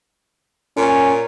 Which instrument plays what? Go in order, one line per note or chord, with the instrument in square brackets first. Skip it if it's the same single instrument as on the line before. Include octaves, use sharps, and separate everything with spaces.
[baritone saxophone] A#2 [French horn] C#4